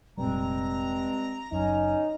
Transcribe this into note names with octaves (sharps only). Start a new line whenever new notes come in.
F1 G2 A#2 G3 G#3 C4 A#5
F#1 F#2 C#4 D#4